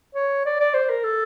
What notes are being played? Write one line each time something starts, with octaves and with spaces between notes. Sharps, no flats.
C#5
D5
D5
C5
A#4
A4